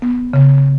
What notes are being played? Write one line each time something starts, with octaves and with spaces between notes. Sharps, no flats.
B3
C#3